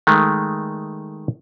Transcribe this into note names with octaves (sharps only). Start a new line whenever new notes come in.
D#3 G#3 A3